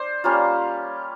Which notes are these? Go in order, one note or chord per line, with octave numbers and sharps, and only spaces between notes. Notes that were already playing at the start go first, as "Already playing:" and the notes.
Already playing: D4 C5
G3 A#3 C#4 F4